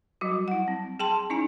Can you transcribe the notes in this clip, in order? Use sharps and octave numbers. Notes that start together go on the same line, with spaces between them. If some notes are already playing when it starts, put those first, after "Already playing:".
F#3 G3 F#4
E4 F#5
C4
G#4 G5 A5 C6
C#4 D#4 E4 G#5